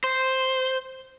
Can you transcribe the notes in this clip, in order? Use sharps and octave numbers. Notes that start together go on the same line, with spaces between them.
C5